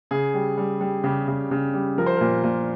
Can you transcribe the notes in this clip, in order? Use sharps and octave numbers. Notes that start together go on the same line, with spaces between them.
C#3 G#4
G3
G3
G3
C#3 G4
C#3
C#3
G3
F3 A#4
C5
A#2 A#4
A#2